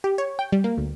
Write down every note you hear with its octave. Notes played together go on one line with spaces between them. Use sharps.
G4
C#5
G5
G3
A#3
D2